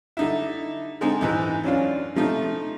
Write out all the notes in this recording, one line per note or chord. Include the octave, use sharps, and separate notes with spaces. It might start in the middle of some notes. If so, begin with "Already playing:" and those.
D3 D#4 E4
D3 G#3 C4 D#4
G#2 E3 D#4
F#2 C#4 D4 F4
C3 F3 A3 D#4